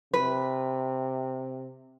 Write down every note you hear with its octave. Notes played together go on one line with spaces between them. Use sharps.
C3 B4